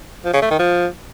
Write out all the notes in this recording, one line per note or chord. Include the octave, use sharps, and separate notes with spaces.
F3
C#3
A3
D#3
F3